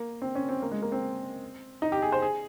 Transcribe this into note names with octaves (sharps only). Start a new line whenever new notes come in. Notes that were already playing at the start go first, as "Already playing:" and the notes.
Already playing: A#3
C4
C#4
C4
A#3
G#3
A#3
C4
D#4
G4
G#4
C5
G#4